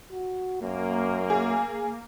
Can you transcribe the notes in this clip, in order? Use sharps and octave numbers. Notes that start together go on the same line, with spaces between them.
F#4
F#2 A#3
G#4